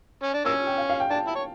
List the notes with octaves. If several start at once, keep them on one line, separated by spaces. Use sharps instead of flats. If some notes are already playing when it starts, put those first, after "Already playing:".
C#4
D4
A#3 C#4 E6
G5
F5
F5
G5
D4 A5
E4
C#5